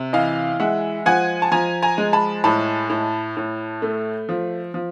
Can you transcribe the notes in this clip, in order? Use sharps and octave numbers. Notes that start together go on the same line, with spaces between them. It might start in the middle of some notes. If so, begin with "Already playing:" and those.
Already playing: C3
E3 D#5 F5
G#3 E5 F#5
F3 F#5 G#5
A5
F3 G#5 A#5
G#5 A#5
G#3
A5 B5
A2 A5 B5
A2
A2
A3
F3
F3